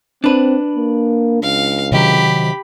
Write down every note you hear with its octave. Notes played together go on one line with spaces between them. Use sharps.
C4 D4 B4
A#3
C#2 F5
C3 D#3 F#3 G4 B5